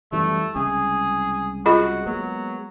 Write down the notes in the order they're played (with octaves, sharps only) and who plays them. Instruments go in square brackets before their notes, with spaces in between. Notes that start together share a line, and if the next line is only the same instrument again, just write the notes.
[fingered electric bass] F#2 E3 G3 [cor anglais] A3
[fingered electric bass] C2 C#3 G#3 [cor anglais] G#4
[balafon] F4 G#4 D#5 [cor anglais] F#4
[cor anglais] F#3 [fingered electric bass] G#3 A#3 B3